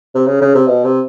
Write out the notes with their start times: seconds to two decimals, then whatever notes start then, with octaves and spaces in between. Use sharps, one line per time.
0.15 C3
0.27 C#3
0.41 C#3
0.54 C3
0.67 B2
0.84 C3